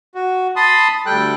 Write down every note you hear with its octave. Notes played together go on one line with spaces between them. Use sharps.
F#4
A5 B5 C6 D#6
D2 G3 A4 G5 F#6